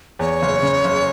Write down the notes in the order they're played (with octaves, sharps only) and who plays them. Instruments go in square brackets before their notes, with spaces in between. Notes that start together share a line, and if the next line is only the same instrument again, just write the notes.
[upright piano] E2 [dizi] C#5
[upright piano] F#1
C#3
F#1